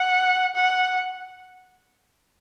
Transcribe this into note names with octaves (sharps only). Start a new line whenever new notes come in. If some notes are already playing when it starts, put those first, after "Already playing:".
Already playing: F#5
F#5